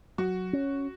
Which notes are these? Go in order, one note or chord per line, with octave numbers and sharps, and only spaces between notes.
F#3 F#4
C#4